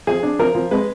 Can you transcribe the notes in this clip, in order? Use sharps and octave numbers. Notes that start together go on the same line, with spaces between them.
F3 G#4
D4
F3 A#4
F3
G#3 B4